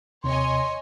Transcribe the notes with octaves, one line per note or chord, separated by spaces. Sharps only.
D#2 C3 C#5 D#5 G#5 C6